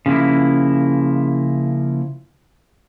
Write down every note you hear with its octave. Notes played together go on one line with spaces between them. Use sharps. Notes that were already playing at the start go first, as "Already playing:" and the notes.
C#3 F3 A#3 E4